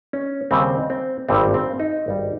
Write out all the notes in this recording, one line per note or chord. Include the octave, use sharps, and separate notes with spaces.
C#4
D#2 C#3 G3 C4
C4
G#1 G2 G3 C4
C4
D#4
G#1 G2 G3